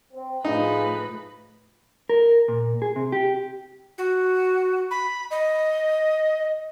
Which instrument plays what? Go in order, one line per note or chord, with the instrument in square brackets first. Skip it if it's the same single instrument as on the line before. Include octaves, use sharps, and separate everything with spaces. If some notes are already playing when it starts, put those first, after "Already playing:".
[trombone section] C4
[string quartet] A2 F3 B4 [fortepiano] D#4 [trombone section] F4 G#4
[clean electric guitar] A#4
A#2
G#4
C3
G4
[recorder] F#4
B5
D#5